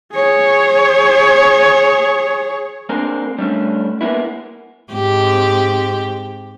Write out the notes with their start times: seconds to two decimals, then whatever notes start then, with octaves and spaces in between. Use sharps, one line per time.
0.14 G#4 C#5
2.89 G#3 A#3 C4 D4 A#4
3.38 G3 A3 C#4 D4
4.01 G#3 A#3 B3 E4
4.93 G#2 C4 G4